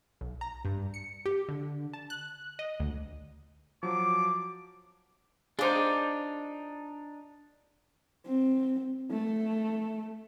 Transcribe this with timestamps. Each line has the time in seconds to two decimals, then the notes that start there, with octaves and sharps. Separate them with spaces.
0.21 B1
0.41 A#5
0.65 G2
0.94 C#7
1.26 G4
1.48 D3
1.93 A5
2.10 F#6
2.59 D#5
2.80 D2
3.83 F3 F#3 D6
5.59 D4 D#4 F4 G#4 C5 D6
8.26 C4
9.11 A3